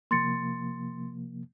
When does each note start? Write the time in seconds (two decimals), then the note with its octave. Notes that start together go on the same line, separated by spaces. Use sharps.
0.11 C3 F3 A#3 C6 A6 C#7